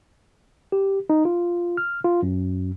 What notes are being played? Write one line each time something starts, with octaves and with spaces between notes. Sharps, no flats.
G4
D#4
F4
F6
F4
F#2